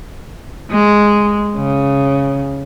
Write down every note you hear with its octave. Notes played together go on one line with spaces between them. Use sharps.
G#3
C#3